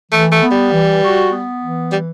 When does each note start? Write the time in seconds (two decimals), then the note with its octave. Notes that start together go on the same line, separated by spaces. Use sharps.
0.12 E3 A3
0.32 A3
0.42 B3
0.51 G3
0.73 E3
1.02 F#4
1.32 B3
1.62 E3
1.92 G3